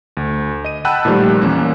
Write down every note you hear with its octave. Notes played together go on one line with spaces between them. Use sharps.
D2
D#5 D#7
F#5 G5 A5 B5 E6 F#6
A#2 D#3 F3 G3 A3
E2 A#3 C#4